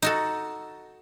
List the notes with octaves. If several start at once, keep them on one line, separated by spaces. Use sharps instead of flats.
D#4 F#4 A4